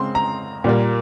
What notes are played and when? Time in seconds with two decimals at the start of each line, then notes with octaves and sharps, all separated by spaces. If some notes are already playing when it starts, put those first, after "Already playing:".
Already playing: C#3 G#3 C4 C6
0.15 A#5
0.64 A#2 G3 A#3